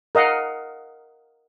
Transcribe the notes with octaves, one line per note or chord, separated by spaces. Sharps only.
A#4 D#5 F5 F#5